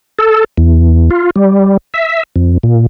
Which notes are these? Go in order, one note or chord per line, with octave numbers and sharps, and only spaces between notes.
A4
E2
F4
G3
E5
F2
A#2